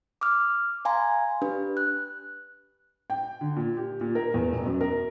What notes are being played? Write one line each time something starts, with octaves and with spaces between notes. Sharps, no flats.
D6 D#6 F6
F5 G#5 A#5 C6
D4 G4 B4
F#6
G5
D3
A#2
G4
A#2
A#4
E2
E1
F#2
A#4